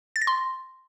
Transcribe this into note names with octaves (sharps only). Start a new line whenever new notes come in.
A6
A#6
C6